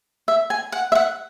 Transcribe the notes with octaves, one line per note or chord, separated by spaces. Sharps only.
E5
G#5
F#5
E5
F#5